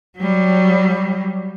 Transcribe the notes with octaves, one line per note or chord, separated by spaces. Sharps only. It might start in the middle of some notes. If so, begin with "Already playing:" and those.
F#3 G3